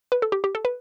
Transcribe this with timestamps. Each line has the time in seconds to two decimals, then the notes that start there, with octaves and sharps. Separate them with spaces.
0.12 B4
0.22 A4
0.32 G4
0.44 G4
0.55 A4
0.65 B4